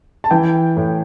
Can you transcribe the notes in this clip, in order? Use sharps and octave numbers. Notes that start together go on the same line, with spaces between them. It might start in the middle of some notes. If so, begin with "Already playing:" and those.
A5
E3 G5
A2